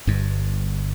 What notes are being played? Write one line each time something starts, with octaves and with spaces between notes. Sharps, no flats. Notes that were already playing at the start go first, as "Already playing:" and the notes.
G1 G2